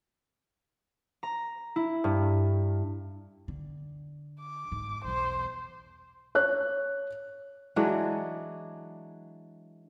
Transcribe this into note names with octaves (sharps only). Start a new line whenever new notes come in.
A#5
E4
G2
D3
D6
G#2
B1 E2 C5
C#5 F#6
E3 F#3 G#3 D4